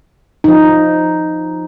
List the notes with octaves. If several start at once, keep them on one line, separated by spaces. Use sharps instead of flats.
F3 D#4